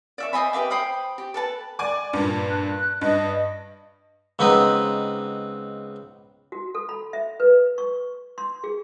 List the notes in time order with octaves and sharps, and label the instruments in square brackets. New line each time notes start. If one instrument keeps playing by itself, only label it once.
[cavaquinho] D5 E5 C#6
C5 D#5 G#5 B5
G4 B4 E5 D6
C5 G5 B5 D#6
G4
A4 B4 A5
[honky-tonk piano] D5 G#5 D6
G2 A#2
[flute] F#6
[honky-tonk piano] G2 [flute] D#5
[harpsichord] C#2 B3 C4 D#4 B4
[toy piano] F#4
A4
B5
E5
B4
C#6
C6
G#4